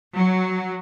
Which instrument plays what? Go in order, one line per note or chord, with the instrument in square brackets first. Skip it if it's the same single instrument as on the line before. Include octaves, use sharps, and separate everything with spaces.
[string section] F#3